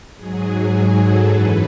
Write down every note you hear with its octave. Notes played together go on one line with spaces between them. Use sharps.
G#2 F#3 G#4
A4
F#2 E3 B4